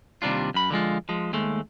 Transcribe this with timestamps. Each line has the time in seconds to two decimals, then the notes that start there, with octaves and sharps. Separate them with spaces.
0.22 D#2 C3 G3 D4 F4
0.54 F#2 B5
0.71 D3 F3 G#3 F4
1.09 F3 G#3
1.33 D#2 G#3 A3